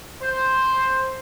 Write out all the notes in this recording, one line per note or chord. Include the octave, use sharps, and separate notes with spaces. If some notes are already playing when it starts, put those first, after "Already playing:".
C5